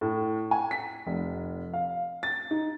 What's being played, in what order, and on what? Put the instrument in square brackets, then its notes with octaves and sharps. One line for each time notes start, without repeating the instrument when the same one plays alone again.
[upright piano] A2
G#5
B6
F1
F5
A6
D#4